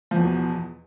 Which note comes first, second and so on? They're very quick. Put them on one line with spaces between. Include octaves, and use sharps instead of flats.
F3 E2 B2